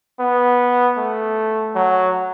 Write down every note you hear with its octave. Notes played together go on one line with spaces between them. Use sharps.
B3
A3
F#3